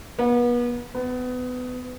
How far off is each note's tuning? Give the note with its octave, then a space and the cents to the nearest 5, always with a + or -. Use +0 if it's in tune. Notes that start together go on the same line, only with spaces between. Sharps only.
B3 -35
B3 +25